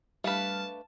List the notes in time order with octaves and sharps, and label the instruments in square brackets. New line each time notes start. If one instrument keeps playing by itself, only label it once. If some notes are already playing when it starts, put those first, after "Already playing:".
[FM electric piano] G3 F6 [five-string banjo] A3 B4 [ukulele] D4 F4 F5 [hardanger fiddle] A5